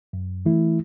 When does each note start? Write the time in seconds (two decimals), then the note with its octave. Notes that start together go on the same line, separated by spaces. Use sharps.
0.13 F#2
0.46 E3 A3 E4